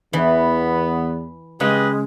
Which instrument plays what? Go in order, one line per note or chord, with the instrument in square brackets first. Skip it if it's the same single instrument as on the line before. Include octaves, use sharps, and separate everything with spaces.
[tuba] E2 [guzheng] E3 [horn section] B3
[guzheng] C#3 [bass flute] G#3 [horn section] G4 B4 D#5